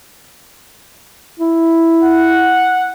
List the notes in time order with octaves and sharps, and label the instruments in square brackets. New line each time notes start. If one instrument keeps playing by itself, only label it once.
[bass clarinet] E4
[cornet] F#5